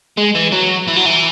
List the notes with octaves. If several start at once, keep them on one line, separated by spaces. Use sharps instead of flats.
G#3
E3
F#3
E3
F#3
E3